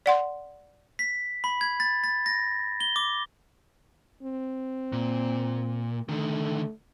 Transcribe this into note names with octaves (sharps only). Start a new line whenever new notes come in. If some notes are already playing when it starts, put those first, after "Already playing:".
D5 F#5 C6
B6
B5
G#6
A6
A6
A#6
G7
D6
C4
A#2
D3 D#3 A3